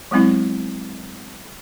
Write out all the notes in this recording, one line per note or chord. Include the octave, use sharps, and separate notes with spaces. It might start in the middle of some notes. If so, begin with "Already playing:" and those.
F#3 G#3 B3 C4 E4